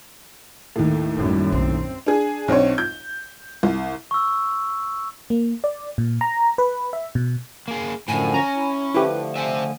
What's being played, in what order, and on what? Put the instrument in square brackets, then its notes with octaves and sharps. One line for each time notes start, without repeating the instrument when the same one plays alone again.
[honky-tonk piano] D#2 A2
[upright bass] A1 [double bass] F#2 G3
[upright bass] B1 [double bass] C4
[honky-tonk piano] D4 G#4
B1 C4 D4 C#5
G6
C2
[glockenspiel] C#6 E6
[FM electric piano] A#3
D5
A#2
A#5
B4
E5
B2
[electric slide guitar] A#3 G#4
[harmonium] F#2 D3 F3 [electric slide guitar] A2 [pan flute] G#5
[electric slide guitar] C#4 [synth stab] A#5
[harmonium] E4
[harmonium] D3 F3 A3 [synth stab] E4 G4 [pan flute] B4
[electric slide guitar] C5 E5 [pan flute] G#5